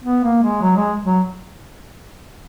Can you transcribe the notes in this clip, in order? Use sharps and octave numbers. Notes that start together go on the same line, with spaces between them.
B3
A#3
G#3
F#3
G#3
F#3